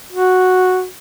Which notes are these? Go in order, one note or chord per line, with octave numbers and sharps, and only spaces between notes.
F#4